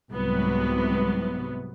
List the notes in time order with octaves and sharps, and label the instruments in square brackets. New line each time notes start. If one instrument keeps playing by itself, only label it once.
[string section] C2 G#2 C3 F#3 B3